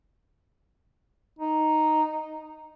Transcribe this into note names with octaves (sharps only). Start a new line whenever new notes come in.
D#4